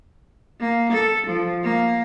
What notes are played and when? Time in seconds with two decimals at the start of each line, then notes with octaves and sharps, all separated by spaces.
0.60 A#3
0.93 A4
1.27 F3
1.64 A#3